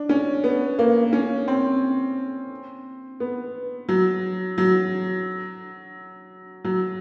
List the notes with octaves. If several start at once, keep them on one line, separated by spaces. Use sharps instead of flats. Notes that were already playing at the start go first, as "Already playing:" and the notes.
Already playing: D4
C#4
B3
A#3
C#4
C4
B3
F#3
F#3
F#3